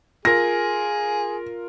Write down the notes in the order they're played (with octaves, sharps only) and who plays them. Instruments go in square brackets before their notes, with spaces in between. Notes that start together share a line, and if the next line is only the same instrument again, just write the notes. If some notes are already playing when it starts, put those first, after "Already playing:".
[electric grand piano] F4 A#4 [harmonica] G#4 [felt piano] A#6